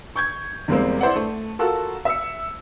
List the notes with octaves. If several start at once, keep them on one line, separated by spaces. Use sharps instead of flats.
C#6 G6 G#6
E2 G3 G#3 A#3 C4
E4 C5 D5 F#5
A3
F4 F#4 A4 A#4
E5 E6 C#7